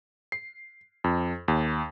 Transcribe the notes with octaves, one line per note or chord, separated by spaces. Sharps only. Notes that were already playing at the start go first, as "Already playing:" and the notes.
C7
F2
D#2